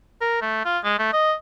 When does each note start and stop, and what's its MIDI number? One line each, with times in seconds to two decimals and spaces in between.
0.21 0.39 70
0.42 0.63 57
0.65 0.78 65
0.84 0.94 56
0.99 1.10 57
1.13 1.34 75